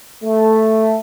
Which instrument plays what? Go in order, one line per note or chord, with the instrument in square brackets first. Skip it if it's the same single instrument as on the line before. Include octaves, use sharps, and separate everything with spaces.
[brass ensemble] A3